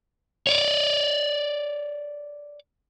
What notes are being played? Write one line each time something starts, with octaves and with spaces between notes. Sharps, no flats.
C#5 D5